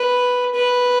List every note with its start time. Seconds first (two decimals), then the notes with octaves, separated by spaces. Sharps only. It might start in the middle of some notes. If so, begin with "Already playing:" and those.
Already playing: B4
0.54 B4